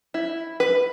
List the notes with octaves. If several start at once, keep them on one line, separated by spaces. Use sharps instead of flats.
E4
B4